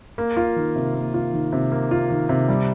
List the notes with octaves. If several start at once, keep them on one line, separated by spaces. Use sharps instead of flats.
A#3
F4
D#3
C3
A#3
F4
D#3
C3
A#3
F4
D#3
C3
G3